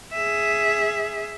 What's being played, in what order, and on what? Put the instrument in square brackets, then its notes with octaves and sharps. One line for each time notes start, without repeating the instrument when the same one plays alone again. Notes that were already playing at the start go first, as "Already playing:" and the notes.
[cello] G#4 E5